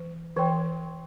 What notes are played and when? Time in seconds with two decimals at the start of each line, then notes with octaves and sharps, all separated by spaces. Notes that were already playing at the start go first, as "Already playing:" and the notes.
Already playing: E3
0.36 E3 A#4 C#5 G5 C6